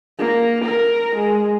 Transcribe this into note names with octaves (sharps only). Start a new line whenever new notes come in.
A#3
A#4
G#3